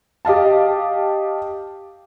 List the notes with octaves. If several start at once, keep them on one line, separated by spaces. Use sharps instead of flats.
G4 D#5 F5 A5